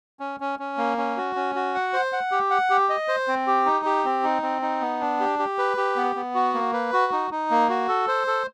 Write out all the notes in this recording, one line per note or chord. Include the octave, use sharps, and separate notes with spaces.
C#4
C#4
C#4
A#3
C#4
F#4
C#4
F#4
F#5
C5
F#5
G4
F#5
G4
D#5
C5
C4
G4
D#4
G4
C4
D#4
C4
D#4
B3
D4
G4
G4
B4
G4
B3
B3
F#4
A#3
B4
F#4
D#4
D#4
A#3
F#4
A4
C5
A4